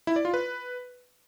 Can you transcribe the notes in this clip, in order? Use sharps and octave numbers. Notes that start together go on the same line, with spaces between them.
E4
D5
F4
B4